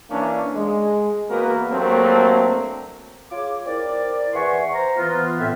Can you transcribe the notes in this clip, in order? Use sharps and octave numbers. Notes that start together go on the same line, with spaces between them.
E3 A#3 C#4 D4
G#3
E2 A#3 B3 F#4 A#4 B4
G2 F#3 A3 A#3 C4
F4 G#4 C#5 D6
C4 E4 A#4 D5
E2 E5 F#5 G#5 C6 C#6
C5 A#5
E3 B3 F4
A2 C4 E5